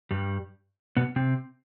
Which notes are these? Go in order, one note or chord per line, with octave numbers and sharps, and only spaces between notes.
G2 G3
B2 B3
C3 C4